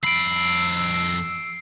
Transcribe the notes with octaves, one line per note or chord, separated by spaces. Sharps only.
F2 B5 E6 C7 D7